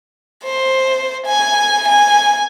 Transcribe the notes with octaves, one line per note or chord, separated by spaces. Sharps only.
C5
G#5
G#5